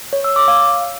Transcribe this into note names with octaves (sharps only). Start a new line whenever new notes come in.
C#5
E6
D6
F5